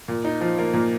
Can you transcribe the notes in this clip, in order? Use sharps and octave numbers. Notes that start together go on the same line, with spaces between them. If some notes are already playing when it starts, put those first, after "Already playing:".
A#2
D#4
F3
A#3
A#2